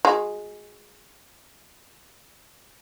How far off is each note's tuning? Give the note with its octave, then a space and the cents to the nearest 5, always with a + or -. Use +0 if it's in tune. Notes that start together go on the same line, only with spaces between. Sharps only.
G#3 +0 F#4 -35